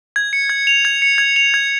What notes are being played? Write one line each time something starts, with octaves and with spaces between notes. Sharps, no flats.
G#6
C#7
G#6
F7
G#6
C#7
G#6
F7
G#6